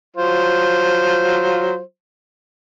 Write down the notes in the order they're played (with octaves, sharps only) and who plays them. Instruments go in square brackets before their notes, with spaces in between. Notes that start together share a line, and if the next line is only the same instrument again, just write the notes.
[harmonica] F#3 F4 C5